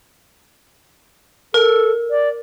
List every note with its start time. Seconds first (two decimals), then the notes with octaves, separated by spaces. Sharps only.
1.54 A4 A#4
2.10 D5